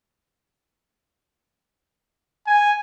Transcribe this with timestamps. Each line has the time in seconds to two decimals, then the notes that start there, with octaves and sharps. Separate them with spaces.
2.46 G#5